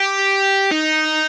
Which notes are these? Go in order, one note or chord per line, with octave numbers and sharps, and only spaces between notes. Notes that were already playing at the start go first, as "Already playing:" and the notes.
Already playing: G4
D#4